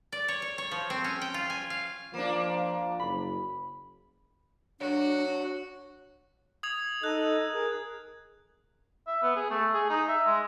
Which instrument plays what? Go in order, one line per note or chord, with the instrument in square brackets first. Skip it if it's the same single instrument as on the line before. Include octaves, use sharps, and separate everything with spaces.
[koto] D5
C#5
C#5
C#5
F3
C4
C#4
G5
F4
G#5
F5
[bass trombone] F3 [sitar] A#3 D4
[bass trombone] F#1 [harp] B5
[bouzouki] F#3 [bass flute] D4 [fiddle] F#4
[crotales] D#6 G#6 F7
[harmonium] D#4 A4 D#5 [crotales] F#6
[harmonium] G#4 A#4
[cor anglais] E5
B3
G#4
A3
G#4
D#4
E5
G#3